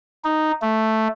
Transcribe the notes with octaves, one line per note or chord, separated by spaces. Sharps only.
D#4
A3